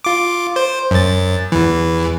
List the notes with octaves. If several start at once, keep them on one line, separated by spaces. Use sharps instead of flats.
F4 D6
C5
F#2 A6
E2 E3